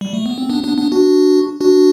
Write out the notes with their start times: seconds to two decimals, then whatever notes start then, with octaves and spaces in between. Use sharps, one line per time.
0.01 G3
0.14 A3
0.26 B3
0.38 C4
0.50 B3 D4
0.63 B3 D4
0.78 B3 D4
0.92 D4 F#4
1.61 D4 F#4